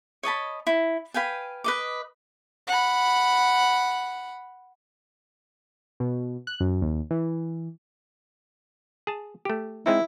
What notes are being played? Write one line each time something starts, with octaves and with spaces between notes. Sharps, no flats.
C#5 D#5 A5 B5
E4
B4 F5 G5 G#5
B4 D#5 D6
F#5 B5
B2
F#6
F#2
D#2
E3
G#4 A5
A3 G4
G#3 C4 D#4 E4